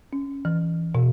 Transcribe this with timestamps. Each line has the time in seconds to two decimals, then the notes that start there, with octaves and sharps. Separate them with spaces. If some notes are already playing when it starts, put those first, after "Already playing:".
0.13 C#4
0.45 E3
0.95 B2